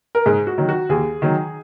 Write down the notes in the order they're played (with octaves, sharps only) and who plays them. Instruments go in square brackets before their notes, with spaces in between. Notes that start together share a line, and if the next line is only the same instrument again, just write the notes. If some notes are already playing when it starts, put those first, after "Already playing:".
[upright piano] A#4
G#2 G#4
F#4
D#3 F#3
F#4
D#2 G#4
D#3 F#3